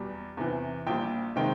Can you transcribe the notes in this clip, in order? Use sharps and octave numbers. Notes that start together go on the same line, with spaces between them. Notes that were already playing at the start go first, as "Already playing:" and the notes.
Already playing: E2 B2 G3
E2 C3 E3
A#1 A#2 G3 G5
C3 D#3 G#3 G5